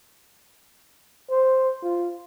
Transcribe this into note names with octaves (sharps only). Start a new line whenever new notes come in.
C5
F4